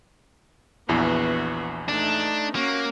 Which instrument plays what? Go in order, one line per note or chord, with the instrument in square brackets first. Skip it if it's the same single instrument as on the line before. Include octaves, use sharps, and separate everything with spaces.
[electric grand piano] A#1 E2 E3 [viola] B3 F#4
[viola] A3 D#4 [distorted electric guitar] D4
[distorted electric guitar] A#3 [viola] C#4 F#4